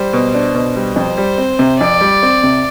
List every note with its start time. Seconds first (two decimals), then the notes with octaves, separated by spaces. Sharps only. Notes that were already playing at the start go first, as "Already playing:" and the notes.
Already playing: G3 C5
0.13 B2
0.34 D4
0.55 B2
0.76 G3
0.96 F2 C5
1.17 G3
1.38 C4
1.59 C3
1.80 F2 D5
2.01 G3
2.23 C4
2.43 C3